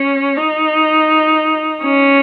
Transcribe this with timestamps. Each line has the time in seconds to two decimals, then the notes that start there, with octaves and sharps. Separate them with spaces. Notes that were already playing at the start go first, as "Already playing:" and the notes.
Already playing: C#4
0.37 D#4
1.83 C#4